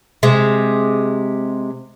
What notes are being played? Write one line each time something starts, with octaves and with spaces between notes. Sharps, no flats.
C3 G#3